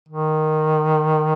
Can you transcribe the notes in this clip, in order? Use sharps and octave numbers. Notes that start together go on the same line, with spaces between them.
D#3